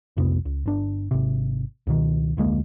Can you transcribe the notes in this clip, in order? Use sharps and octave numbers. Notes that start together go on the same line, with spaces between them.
B1 F2 C3 B3
C#2
G1 D4
G#1 C3
C#2 B2 D#3
F1 D2 G#3 A#3